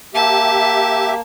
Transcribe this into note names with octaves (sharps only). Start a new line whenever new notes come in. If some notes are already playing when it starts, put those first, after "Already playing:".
A#3 G4 E5 A5